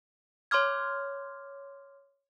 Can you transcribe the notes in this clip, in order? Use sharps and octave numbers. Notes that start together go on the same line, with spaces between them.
C#5 C6 D6 F6 G#6